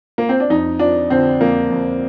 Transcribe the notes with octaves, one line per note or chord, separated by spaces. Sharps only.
A#3
C4
D4
F2 D#4
F3 D4
D3 C4
F2 A#3
F2